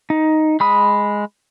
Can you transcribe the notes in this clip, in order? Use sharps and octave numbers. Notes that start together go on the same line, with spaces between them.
D#4
G#3 B5 D#6